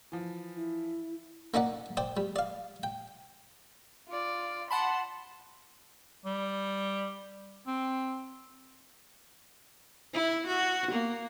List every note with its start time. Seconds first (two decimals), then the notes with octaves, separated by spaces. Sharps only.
0.12 E3 F3
0.56 E4
1.54 A#3 C#4 D#4 D5 F#5
1.97 C5 D5 G5
2.17 G3
2.36 D5 F5
2.83 G5
4.09 F4 D5
4.71 F#5 A5 B5 C6
6.26 G3
7.67 C4
10.14 E4
10.47 F#4
10.92 A#3